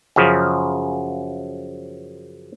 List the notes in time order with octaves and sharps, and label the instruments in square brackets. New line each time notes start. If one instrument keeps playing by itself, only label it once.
[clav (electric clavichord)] F#2 C#3 F3